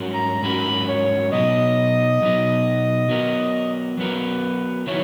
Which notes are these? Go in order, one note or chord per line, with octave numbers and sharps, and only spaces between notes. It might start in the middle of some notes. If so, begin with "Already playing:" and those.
Already playing: G#2 F#3 C#4 F#4 A#4
A#5
G#2 F#3 C#4 F#4 A#4 B5
C#5
B2 F#3 B3 D#4 D#5
B2 F#3 B3 D#4
F#3 B3 F#4 A#4
F#3 B3 F#4 A#4 B4
D#3 F#3 B3 E4 C#5